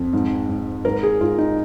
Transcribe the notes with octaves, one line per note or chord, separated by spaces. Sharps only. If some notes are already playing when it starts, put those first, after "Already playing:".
Already playing: F2
G#2
G#2
G#2 A#4
G#4
G#2 F4
D#4